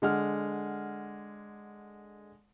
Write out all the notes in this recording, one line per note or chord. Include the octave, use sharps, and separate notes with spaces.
D3 G#3 F#5 F6